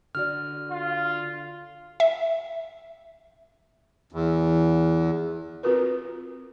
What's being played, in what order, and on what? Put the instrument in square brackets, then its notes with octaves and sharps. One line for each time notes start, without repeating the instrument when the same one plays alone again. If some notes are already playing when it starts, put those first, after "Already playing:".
[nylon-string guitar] D3 F#4 D5 [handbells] F6
[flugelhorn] F4
[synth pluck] E5
[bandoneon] E2
[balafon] C4 F4 F#4 A#4 B4